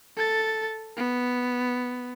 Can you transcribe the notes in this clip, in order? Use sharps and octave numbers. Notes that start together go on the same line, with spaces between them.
A4 A6
B3